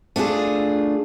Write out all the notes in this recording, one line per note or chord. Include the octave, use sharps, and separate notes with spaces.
A3 D4 F4 G#4